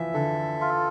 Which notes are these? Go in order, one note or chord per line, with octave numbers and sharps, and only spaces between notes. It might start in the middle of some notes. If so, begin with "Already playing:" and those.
Already playing: E3 F3 E5
D3 A4
F4